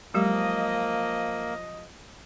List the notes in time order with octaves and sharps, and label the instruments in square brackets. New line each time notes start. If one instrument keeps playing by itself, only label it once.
[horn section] F3 D#5 [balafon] F#3 G#3 G4 [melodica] A#3